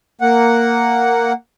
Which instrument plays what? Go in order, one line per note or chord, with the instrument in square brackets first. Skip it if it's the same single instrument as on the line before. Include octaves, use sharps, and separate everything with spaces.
[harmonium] A#3 F#5